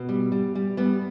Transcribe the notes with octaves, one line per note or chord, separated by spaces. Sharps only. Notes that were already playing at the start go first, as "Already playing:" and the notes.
Already playing: B2
G3
G3
G3
G3 B3